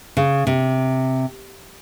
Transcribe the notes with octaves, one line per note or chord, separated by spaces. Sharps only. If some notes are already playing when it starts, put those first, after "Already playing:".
C#3
C3